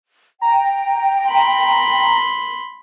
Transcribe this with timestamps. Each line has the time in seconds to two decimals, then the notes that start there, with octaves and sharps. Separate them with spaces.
0.41 G5 A#5
1.29 B5 C6